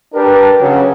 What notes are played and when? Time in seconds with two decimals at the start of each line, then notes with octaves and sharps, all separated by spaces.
0.15 D4 G4 A#4 B4
0.60 C#3 F#3